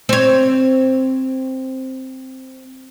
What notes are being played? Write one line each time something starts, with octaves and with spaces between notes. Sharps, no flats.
C4 C#5